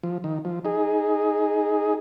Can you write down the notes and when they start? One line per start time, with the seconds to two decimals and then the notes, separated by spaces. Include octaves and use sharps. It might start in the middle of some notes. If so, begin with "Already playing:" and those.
0.03 F3
0.24 D#3
0.45 F3
0.65 D#4 G#4